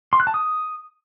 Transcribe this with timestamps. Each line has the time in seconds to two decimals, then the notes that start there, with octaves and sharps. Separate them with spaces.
0.13 C6
0.20 F#6
0.27 A5
0.34 D#6